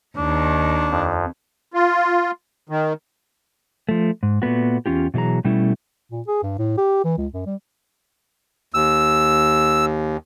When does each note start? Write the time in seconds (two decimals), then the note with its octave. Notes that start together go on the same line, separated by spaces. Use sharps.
0.17 D#2 D#3 D4
0.91 F2
1.74 F4
2.69 D#3
3.89 F3 A3
4.23 G#2
4.42 A#2 A3 B3 F#4
4.86 E2 C#4 F4 G4
5.14 B2 E3 F#3 G#4 A#5
5.44 B2 G3 A3 C#4 E4
6.11 A#2
6.27 G#4
6.43 G2
6.59 A2
6.78 G4
7.04 E3
7.17 C#2
7.33 F#2
7.46 G3
8.74 D#2 E6